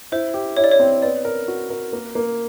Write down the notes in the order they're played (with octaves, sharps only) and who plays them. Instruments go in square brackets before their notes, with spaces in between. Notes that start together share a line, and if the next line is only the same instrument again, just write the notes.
[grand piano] E4 [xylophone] C5
[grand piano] G4
[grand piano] E4 [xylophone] C#5
[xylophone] D5
C#5
[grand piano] C4
[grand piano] B3 [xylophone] D5
[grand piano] A#4
F#4
A#4
A#3
A#3